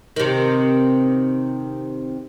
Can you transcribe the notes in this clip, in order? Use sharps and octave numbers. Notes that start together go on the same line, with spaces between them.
C3 D#3